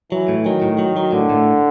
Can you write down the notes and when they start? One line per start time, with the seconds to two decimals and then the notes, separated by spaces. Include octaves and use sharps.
0.12 E3 F#3
0.28 A2
0.45 D#3 F#3
0.62 A2
0.79 F#3
0.96 F#3
1.12 A2 D3
1.30 A2